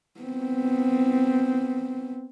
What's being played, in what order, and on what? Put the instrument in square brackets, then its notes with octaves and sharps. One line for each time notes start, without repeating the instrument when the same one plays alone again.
[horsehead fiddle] B3 C4